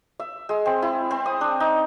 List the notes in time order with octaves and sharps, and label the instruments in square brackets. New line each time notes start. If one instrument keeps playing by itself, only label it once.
[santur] E5
G#3
C4
E4
C4
D#6
D4
D#4